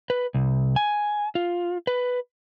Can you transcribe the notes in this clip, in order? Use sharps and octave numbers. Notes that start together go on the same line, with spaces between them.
B4
C2
G#5
F4
B4